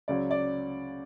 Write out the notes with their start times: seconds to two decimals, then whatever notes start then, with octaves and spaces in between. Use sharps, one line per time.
0.08 C#2 C#3 F#3 D5
0.31 D5